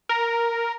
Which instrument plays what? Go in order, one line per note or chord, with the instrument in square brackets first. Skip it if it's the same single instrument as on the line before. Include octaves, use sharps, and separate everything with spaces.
[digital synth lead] A#4